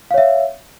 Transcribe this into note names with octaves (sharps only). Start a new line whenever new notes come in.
C#5 E5 F5